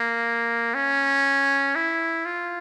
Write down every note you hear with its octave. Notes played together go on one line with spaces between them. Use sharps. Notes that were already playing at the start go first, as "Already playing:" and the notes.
Already playing: A#3
C#4
E4
F4